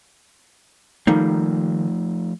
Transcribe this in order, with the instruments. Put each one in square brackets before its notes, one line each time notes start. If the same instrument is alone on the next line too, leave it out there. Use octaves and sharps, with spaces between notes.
[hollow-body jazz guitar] D#3 G3 A#3 [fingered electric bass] F3 A3 [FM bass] D#4